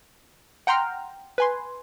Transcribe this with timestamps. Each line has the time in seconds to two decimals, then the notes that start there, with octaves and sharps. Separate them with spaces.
0.67 F#5 G5 A#5 C6 F6
1.38 B4 G#5 C6